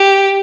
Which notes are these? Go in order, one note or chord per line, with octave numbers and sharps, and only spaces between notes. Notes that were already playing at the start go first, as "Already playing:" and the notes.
Already playing: G4